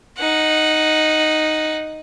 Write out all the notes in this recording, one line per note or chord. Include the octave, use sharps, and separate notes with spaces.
D#4 F#5